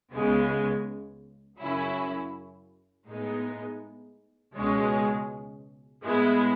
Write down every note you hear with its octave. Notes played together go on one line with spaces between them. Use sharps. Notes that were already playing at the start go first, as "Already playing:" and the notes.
C#2 C#3 G#3 B3
F#2 C#3 F#3 C#4 E4
A2 G#3 B3 D#4
C#2 B2 G#3 C#4
A2 G#3 B3 E4